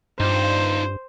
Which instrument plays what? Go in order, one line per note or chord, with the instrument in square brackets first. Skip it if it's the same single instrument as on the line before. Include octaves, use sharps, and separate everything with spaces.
[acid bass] G2 [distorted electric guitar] D#4 F4 [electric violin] C5